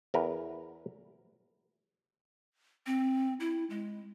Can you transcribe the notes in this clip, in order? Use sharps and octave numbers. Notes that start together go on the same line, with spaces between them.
E2 A#4 B4
C4
E4
G#3